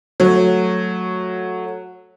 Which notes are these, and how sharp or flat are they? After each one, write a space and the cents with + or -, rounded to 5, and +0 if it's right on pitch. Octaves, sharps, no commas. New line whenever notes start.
F#3 -10 A3 +0